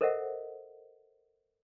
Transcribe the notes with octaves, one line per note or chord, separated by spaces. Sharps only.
A4 A#4 C5 D#5 E5 F#5